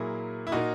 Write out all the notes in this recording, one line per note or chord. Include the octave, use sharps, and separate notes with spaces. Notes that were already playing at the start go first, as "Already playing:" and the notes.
Already playing: A#2 F#3 A#3 E4 G#4
E4
A#2 A#3 D#4 F#4